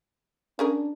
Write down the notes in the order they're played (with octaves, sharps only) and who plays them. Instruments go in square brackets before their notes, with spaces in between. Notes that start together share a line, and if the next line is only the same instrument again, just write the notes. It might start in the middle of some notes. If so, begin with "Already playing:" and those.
[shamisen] C#4 G#4 A#4 [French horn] D4